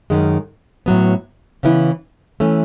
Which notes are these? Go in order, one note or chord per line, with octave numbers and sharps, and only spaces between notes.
F#2 D#3 G#3
A2 F#3 B3
C#3 E3 B3 E4
E3 A3 C#4